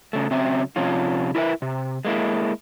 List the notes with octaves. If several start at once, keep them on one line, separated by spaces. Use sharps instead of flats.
C#3 A3
C#3 F#3 C4 E5
C3 F3 C#4 F4
E4 A#4 B4 E5
C3
G#3 A#3 E4